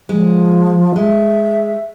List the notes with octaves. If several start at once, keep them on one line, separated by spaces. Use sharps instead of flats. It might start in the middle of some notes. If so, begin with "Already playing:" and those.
F3 G#3
G#3 E5